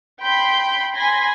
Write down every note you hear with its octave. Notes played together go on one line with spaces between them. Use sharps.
G5 B5 C6 G6
G#5 B5 C6 A#6